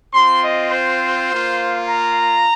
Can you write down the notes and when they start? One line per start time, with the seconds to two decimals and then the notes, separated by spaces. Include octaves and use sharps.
0.13 C4 F4 C6
0.43 D#5
0.72 C5
1.30 A#3 F4
1.88 A#5